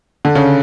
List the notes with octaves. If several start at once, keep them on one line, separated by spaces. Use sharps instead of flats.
D3
C#3